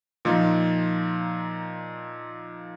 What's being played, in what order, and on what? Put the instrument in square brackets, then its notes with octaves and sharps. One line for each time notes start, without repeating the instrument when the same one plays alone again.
[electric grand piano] A#2 F3 A#3 D#4